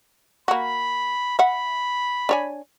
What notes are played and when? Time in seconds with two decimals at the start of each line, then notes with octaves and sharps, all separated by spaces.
0.48 A#3 F#4 B5
1.39 E5 F#5 B5
2.29 D4 C#5 G#5